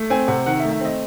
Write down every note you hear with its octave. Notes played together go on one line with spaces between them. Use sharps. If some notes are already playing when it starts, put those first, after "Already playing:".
Already playing: A3
C4 G#5
C3 F#5
D#3 F#5
A3 E5
E5
C4 D#5